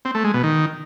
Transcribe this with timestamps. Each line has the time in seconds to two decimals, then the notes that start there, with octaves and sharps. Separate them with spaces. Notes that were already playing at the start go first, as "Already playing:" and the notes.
0.05 C4
0.15 A3
0.24 G#3
0.34 B2
0.43 D#3